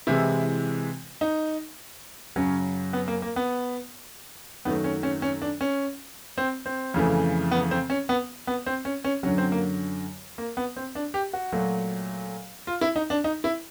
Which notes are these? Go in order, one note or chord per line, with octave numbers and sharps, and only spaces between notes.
C3 E3 G#3 E4
D#4
F#2 C#3 F#3 C#4
B3
A#3
A#3
B3
F#2 D#3 F#3 A3 B3
C#4
C#4
C#4
D4
C#4
C4
C4
F2 C#3 E3 A3
B3
C4
C#4
B3
B3
C4
C#4
C#4
F#2 D3 F#3 C#4
C4
A#3
A#3
B3
C4
D4
G4
F#4
A#2 F#3 A3
F4
E4
D#4
D4
D#4
E4